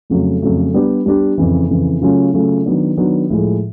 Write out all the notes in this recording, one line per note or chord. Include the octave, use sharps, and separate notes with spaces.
F2 C#3 F#3 A3
F2 C#3 F#3 A3
G3 B3 D4 G4
G3 B3 D4 G4
F2 C#3 E3
F2 C#3 E3
C#3 F#3 A3 C#4 F4
C#3 F#3 A3 C#4 F4
D#3 F#3 B3 D4
D#3 F#3 B3 D4
A2 F3 G#3